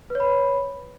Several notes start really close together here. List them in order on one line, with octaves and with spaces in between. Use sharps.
B4 C#5 B5